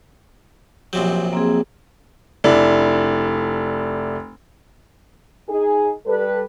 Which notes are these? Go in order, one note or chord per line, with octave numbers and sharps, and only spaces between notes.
A#1 C3 F#3 G4
A#3 C4 G#4
F1 D4 E4
D#4 G#4
G3 A4 B4